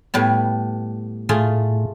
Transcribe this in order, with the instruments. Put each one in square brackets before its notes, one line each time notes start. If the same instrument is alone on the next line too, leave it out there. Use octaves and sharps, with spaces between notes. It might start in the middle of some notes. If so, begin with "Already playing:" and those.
[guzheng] A2 G3 B3
[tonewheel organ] A2 [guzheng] A3 F4 G#4